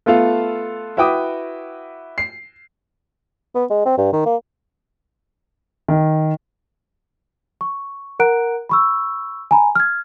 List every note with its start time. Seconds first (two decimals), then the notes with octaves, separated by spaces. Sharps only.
0.06 A3 B3 F4 A4 F5
0.97 E4 F#4 B4 G5 D6 D#6
2.18 C7
3.55 B3
3.70 G#3
3.86 C4
3.98 G2
4.13 D#3
4.26 A#3
5.88 D#3
7.61 C#6
8.20 A#4 F#5 A#5 F#6 D7
8.69 B5 C#6 E6
9.51 G#5 A#5 B5
9.75 F6 G#6